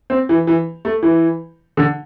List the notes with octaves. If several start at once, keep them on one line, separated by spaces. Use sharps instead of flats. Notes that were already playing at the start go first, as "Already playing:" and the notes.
C4
E3
E3
A3
E3
D3